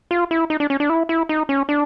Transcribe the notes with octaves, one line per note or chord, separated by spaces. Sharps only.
F4
E4
D#4
D4
C#4
D4
E4
E4
D#4
C#4
D4